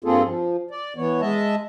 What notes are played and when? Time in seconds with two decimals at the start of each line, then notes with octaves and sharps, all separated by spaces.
0.04 G2 A#3 C4 F4 G#4 A4
0.23 F3
0.71 D5
0.97 E3 B3 C#5
1.21 G#3 D#5 E5 A5